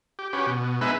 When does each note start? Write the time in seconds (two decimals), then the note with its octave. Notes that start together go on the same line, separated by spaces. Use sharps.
0.19 G4
0.33 C#4 F#4 G4 B4
0.47 B2
0.81 G#3 B3 D#4 B4 E5